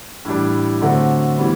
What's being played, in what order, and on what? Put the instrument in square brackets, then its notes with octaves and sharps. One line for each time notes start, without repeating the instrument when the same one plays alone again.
[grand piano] A2 E3 G3 D4
D3 F#3 A3 C4 F#4
E3 G3 B3